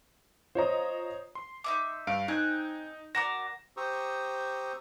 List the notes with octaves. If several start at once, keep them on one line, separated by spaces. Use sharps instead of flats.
F4 C5 C#5 D#5 A#5 D#6
C6
D#4 E5 D6
G2 F5 D7
C4 D#4 G#5 F#6
F#4 A#4 D5 A#6 E7
G4 C5 A#5 C#6 D#6 E6